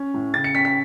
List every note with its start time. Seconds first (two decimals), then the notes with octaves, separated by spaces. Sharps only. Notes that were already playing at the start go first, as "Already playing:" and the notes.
Already playing: C#4
0.14 A2
0.34 C#3 A6
0.44 C#7
0.55 C#4 B6
0.65 B6